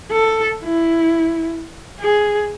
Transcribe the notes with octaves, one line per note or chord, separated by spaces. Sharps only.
A4
E4
G#4